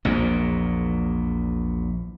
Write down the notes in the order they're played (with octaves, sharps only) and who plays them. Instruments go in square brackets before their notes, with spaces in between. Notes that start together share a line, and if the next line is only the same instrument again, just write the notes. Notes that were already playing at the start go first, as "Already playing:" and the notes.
[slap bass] A#1 E2 A#2